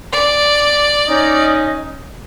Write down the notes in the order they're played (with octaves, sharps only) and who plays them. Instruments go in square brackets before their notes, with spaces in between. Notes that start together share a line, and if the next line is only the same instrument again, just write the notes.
[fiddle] D5
[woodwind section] C#4 D#4 D#5